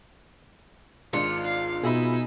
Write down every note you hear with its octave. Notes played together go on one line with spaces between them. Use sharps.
G#1 G#3 D4 F4 C#7
F5
B2 D#4 G#4 E5 B5 E6